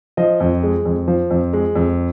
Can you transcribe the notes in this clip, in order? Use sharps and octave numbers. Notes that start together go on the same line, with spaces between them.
F3 D#5
F2
G#3
F2
F3
F2
G#3
F2